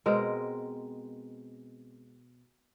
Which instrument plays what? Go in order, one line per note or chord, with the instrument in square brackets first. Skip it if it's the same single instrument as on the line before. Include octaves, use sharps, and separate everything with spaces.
[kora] B2 G#3 C4 A#4